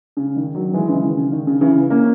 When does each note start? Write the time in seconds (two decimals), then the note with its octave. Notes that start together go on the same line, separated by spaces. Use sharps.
0.17 C#3
0.36 D#3
0.55 D#3 F#3
0.74 E3 G#3
0.89 C#3 E3
1.03 D#3
1.17 C#3
1.32 D#3
1.47 C#3
1.61 C#3 E3
1.90 A#3 C#4